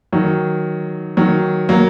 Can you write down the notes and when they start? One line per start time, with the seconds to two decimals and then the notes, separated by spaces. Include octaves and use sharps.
0.13 D#3 F#3
1.17 D#3 F#3
1.69 F#3 A#3